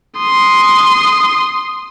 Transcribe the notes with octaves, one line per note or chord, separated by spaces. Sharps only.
C6 D#6